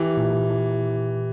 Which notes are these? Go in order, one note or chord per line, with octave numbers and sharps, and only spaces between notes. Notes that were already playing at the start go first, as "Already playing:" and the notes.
Already playing: E3 G4
A#2
E4